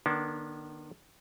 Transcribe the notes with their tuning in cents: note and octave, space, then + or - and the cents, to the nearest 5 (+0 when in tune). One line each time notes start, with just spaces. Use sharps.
D#3 -40 B3 -45 D4 -15